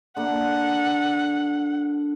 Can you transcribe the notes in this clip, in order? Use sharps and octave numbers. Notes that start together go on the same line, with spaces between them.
D3 A#3 F#5